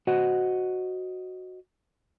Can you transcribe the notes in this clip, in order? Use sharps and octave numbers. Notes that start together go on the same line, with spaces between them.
F#4 C5 D#5 F#5